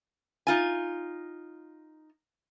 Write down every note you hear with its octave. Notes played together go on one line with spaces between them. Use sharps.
D#4 F4 G#5